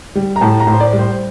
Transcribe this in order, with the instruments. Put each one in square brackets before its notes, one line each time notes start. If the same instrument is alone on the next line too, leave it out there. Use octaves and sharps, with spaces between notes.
[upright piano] G3
A#5
A2 A5
A#5
A2
C5
D5
G3
C5